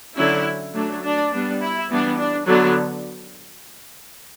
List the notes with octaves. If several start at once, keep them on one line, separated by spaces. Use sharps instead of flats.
D3 F#3 C#4 E4
F#3 A3 D4
D4
G3 B3 D4
E4
E3 G3 B3 D4
D4
D3 F#3 B3 D4